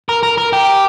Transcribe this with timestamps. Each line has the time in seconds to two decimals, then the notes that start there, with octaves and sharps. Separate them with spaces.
0.09 A#4
0.23 A#4
0.38 A#4
0.53 G4